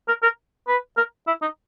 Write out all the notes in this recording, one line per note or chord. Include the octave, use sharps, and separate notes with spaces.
A#4
A#4
B4
A#4
E4
D#4